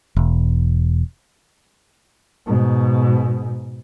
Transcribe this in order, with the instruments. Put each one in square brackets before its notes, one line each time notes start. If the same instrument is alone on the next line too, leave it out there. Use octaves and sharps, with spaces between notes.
[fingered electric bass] E1
[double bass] G#2 B2